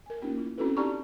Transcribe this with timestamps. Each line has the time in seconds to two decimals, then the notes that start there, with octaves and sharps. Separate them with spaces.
0.06 A#4 G#5
0.21 A3 A#3 C#4 D#4 F4 G4
0.38 E4
0.58 C4 C#4 E4 F#4 A4 B4
0.77 D#4 G4 D5 A5 A#5 C#6